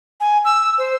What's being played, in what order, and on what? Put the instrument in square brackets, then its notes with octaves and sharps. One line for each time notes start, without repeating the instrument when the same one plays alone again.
[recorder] G#5
E6
C5